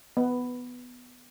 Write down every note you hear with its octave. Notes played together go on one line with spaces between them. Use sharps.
B3